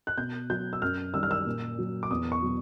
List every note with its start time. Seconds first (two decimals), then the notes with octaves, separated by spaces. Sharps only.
0.07 F#6
0.17 B2 G6
0.50 F#3 G6
0.73 E6
0.82 F#2 F6
1.14 D#3 G3 E6
1.23 F6
1.31 E6
1.46 A#2
1.79 F#3
2.03 D6
2.11 E2 D#6
2.32 C#6
2.43 B2 F#3